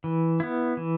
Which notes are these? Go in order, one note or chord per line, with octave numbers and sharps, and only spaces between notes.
E3
B3 E4
E3